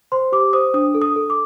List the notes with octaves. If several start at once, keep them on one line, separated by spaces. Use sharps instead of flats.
C5 C6
G4 D6
C5 D#6
D4 D#6
A4
D#6
A4
D6